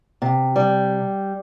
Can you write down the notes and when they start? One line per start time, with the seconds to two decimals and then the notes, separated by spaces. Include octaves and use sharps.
0.22 C3
0.56 G3